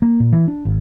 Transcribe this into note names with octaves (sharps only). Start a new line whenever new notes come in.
A#3
A#2
E3
D4
G#1